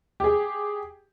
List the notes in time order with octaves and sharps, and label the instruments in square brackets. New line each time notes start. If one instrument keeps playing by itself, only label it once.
[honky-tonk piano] G4 G#4